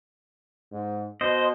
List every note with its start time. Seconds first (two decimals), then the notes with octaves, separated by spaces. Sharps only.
0.72 G#2
1.21 B2 C5 D#5